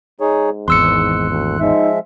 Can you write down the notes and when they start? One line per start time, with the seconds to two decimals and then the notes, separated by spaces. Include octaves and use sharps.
0.20 G#2 D#4 G#4 C#5
0.68 G#1 E2 C6 E6 F#6 C#7
1.30 D2
1.60 F3 G#3 D#4 E5